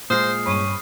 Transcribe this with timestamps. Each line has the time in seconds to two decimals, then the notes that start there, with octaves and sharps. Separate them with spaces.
0.10 A#2 G#3 C5 D#6 F6 C7
0.46 G2 C#4 B5